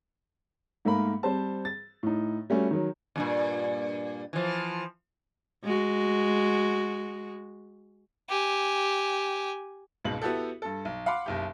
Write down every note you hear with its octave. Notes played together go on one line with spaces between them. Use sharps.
G#2 A3 A#3 A#4 B5
G3 C4 C5 A5
A6
A2 D#4
G3 A3 C#4 F#4
D#3 F#3
E2 G2 A#2
E3 F3
G#3 F#4
G4 G#5
G#1 C#2 G#2 B2 F#7
B3 E4 F#4 G4 A4
G2 A4
B1
F5 F#5 B5 C6 D6
F#1 B1 G4